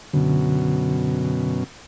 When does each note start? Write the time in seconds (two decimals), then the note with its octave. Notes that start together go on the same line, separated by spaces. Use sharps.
0.14 F#2 B2 D3